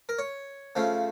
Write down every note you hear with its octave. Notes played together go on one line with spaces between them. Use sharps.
A#4
C#5
C#3 F3 A3